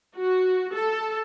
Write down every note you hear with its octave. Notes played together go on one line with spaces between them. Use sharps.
F#4
A4